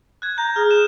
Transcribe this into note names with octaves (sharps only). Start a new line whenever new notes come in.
F#6 G#6
A#5 G6
G#4 F6
E7